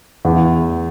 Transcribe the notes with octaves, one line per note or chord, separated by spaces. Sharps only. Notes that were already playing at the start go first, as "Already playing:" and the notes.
E2